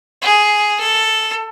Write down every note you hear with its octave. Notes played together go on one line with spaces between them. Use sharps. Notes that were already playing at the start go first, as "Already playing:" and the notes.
G#4
A4